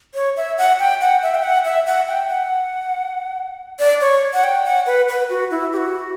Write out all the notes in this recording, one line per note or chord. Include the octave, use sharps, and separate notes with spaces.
C#5
E5
F#5
G5
F#5
E5
G5
F#5
E5
F#5
G5
F#5
D5
C#5
F#5
G5
F#5
B4
B4
F#4
E4
G4
F#4